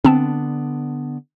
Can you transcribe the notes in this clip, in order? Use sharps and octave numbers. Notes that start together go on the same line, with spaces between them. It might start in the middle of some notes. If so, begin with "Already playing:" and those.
D3 B3 C4 D4 A5